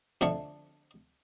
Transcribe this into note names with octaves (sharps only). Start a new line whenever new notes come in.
F2 D3 A3 C#6